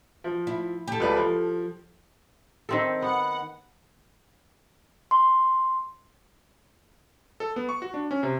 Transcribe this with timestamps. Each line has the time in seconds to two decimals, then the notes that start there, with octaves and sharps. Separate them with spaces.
0.24 F3
0.47 E4
0.87 G4 A4
1.00 C#2 B4 D5
1.17 F3
2.69 D#3 C4 A4
3.02 B3 F#5
5.11 C6
7.40 A4
7.56 B3
7.69 C#6
7.82 F#4
7.94 D4
8.11 C#4
8.23 C3